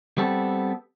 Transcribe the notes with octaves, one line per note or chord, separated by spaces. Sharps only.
G3 B3 C4 A4